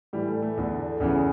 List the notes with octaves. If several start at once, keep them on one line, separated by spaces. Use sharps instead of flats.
A2 E3 G3
A3
A3
E2 D3
E2 C#3 E3